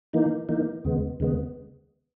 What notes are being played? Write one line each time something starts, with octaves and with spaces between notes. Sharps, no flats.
E3 A#3 D#4
E3 A#3 D#4
D#2 C#3 G#3 B3
D#2 C#3 G#3 B3